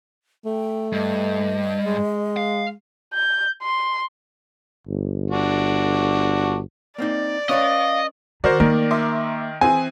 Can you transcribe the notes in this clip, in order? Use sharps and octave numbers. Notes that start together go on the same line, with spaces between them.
A3 G5
G2 D#5
G#3
F5
G6
C6
G1
D4 F#4
A#3 C4 D#4 D5
C#4 B4 C#5 D#5 F5
D#3 F#4 A#4 C5 D5
D#3 A#3 A#4
E5 C6 D6
E3 C4 G#4 G#5